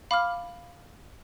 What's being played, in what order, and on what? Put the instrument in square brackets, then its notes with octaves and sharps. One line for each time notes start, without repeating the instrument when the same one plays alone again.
[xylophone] F5 B5 D6 F6